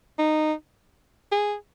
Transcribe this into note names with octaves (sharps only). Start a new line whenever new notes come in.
D#4
G#4